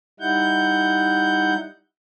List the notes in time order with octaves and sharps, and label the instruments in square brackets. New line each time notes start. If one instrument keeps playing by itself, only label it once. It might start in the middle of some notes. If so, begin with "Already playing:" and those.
[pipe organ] G3 D#4 E4 F#5 G6